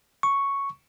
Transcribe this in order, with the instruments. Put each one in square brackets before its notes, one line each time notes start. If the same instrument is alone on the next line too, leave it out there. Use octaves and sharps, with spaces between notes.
[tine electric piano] C#6